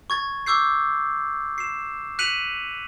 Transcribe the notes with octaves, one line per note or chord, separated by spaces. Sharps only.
C#6 G#6 A6
C#6 D6 E6 G6 C7
C7 E7
F#6 B6 C#7 D#7 F7 F#7